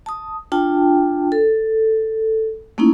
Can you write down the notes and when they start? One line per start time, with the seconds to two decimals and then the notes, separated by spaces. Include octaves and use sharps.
0.06 A5 D#6
0.52 D4 F4 G5 A5
1.32 A4
2.78 A3 A#3 C#4 D#4 E4